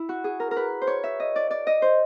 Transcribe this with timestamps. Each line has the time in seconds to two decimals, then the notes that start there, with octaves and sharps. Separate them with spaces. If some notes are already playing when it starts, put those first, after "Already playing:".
Already playing: E4
0.09 F#4
0.24 G#4
0.40 A#4
0.51 A#4
0.56 B4
0.82 C5
0.87 C#5
1.04 E5
1.20 D#5
1.36 D5
1.51 D5
1.67 D#5
1.82 C5